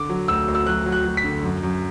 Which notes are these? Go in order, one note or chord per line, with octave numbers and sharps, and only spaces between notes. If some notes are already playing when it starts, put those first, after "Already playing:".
Already playing: D3 D6
F#3
D2 E6
D2
E6
F#3 F#6
F#3
F#6
F#3
B6
D3
F#2
F#2